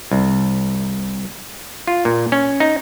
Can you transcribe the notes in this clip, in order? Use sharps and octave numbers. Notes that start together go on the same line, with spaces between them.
C2
F4
A#2
C#4
D#4